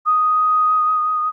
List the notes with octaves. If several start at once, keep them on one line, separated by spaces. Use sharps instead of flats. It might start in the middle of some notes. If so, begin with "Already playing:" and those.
D#6